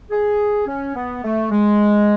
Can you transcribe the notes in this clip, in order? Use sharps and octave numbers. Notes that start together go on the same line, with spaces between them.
G#4
C#4
B3
A3
G#3